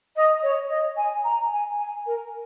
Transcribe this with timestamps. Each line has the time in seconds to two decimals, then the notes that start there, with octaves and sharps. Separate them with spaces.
0.16 D#5
0.42 C#5
0.69 D#5
0.97 G#5
1.24 A#5
1.52 G#5
1.79 G#5
2.06 A#4